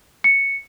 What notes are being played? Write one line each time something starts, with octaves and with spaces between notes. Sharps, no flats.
C#7